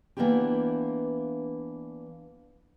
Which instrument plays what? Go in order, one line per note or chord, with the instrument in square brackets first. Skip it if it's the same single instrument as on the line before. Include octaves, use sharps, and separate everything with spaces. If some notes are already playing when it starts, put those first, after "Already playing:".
[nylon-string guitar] E3 A#3 B3 D4 E4 G4